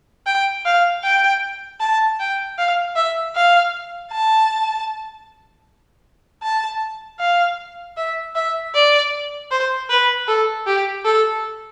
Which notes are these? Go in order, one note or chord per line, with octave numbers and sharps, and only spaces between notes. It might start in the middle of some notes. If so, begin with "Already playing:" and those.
G5
F5
G5
A5
G5
F5
E5
F5
A5
A5
F5
E5
E5
D5
C5
B4
A4
G4
A4